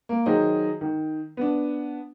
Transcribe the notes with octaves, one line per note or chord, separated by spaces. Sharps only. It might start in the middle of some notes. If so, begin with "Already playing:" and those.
A#3
D#3 F#3 G#4 C5 D#5
D#3
B3 D4